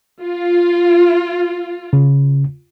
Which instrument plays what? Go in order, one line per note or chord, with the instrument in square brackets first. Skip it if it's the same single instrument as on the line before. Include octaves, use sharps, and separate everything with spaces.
[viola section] F4
[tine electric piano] C#3